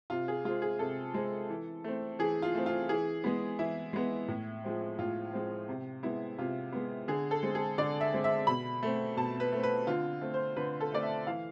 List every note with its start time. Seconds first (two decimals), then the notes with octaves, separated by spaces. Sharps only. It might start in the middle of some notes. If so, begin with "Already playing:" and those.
0.10 C3 F4
0.28 G#4
0.45 G#3 C4 F4
0.62 G#4
0.79 C3 A4
1.14 G#3 C4
1.50 E3
1.84 A3 C4
2.19 E3 G#4
2.42 F4
2.55 A3 C4
2.66 F4
2.89 E3 G#4
3.24 G#3 B3
3.59 E3 E4
3.93 G#3 B3
4.28 A2
4.64 F3 G#3 C4
4.99 A2 F4
5.33 F3 G#3 C4
5.69 C3
6.03 G#3 B3 E4
6.38 C3 F4
6.72 G#3 B3
7.08 D3 G#4
7.31 A4
7.43 G#3 C4
7.55 G#4
7.78 D3 D5
8.01 E5
8.13 G#3 C4
8.24 E5
8.47 B2 B5
8.83 A3 C4
9.17 B2 A5
9.40 B4
9.53 A3 C4
9.63 B4
9.87 D3 F4
10.21 A3 C4
10.34 C5
10.56 D3 B4
10.80 A4
10.92 A3 C4 D5
11.03 E5
11.27 E3 F5